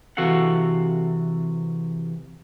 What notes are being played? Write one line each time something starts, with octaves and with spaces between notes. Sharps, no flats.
C3 E3 F#4 A4 F5 F#5